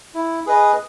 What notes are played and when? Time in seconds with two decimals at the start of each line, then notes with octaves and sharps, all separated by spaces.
0.14 E4
0.46 G#4 B4 D#5